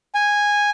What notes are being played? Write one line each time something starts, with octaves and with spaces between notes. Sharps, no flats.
G#5